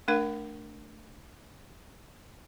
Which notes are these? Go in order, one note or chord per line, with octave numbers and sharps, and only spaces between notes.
A3 D4 A#4 F5